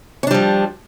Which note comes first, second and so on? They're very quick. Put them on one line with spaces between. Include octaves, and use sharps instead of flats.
C#4 D4 G3 F3